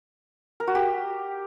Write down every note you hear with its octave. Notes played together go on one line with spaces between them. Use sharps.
A#4
F#4
G4